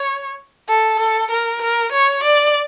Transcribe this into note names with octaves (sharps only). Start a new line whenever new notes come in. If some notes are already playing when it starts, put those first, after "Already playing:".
Already playing: C#5
A4
A4
A#4
A#4
C#5
D5